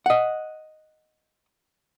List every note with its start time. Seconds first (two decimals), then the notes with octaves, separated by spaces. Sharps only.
0.06 D#5 F#5